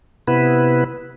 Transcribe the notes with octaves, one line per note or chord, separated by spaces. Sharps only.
C3 B3 E4 B4